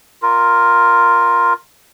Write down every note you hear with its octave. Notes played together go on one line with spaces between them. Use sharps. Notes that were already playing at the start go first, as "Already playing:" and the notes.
F4 A#4